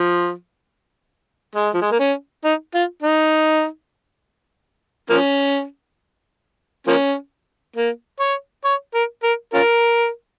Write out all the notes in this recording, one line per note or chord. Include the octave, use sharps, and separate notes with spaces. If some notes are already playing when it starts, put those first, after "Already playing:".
Already playing: F3
G#3
F3
G#3
A#3
C#4
D#4
F4
D#4
F3 A#3 C#4
F3 A#3 C#4
A#3
C#5
C#5
A#4
A#4
C#4 F4 A#4